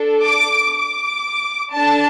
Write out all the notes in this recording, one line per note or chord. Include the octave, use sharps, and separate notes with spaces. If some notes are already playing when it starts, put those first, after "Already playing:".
Already playing: D4 A4
D6
D6
D4 A4 A5